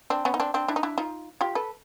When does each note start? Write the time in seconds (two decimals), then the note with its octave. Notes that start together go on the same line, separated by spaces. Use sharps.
0.10 C4 D4
0.25 B3 C#4
0.34 D#4
0.40 C4 D4
0.54 C4 D4
0.68 D4 E4
0.76 D#4
0.83 D4 E4
0.98 D#4 F4
1.41 F4 G4
1.55 A4 B4